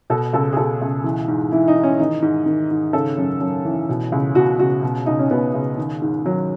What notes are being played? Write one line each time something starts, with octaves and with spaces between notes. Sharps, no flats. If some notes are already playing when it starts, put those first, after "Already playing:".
B2 A4
C#2 A4
G#4
B2 A4
C#2
E3
G#2
E3 E4
D#4
G#2
C#4
D#3 D#4
G#2
D#3
G#2
C#3 A4
F#2
F#2
E3
B2
C#2
B2 F#4
C#2 F#4
B2
C#2 D#4
C#4
B2 B3
C#2
D#3
G#2
D#3 F#3